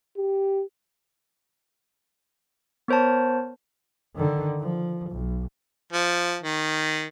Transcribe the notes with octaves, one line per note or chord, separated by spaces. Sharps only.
G4
B3 A#4 C5 C#5 A5
D3 D#3
F3
B1
F3
D#3